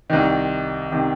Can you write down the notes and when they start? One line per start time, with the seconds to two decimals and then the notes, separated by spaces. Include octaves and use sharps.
0.10 C2 C3 D#3
0.92 C3 D#3